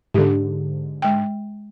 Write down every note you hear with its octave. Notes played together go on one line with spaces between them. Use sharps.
G#2 D3 G4
G#3 G5